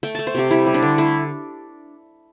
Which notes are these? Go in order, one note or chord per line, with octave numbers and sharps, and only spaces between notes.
A3 G5
A3 A5
C5
C3 G4
G3 E4
G3
D4
D3
A3 E4